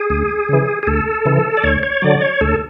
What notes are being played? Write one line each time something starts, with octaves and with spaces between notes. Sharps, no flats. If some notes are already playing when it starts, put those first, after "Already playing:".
Already playing: G#4
D2
C#3 E3
G#4
D2 A4
C#3 E3
D5
D2 C#5
C#5
D3 F#3 D5
C#5
D2 A4